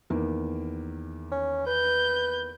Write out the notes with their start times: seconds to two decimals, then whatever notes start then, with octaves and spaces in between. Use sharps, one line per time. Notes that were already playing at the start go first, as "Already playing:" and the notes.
0.10 E2 D#3 A#3
1.32 C#4
1.67 B4 G6